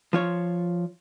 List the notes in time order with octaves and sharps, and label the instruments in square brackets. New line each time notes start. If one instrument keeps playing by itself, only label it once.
[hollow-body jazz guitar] F3 F4 C#5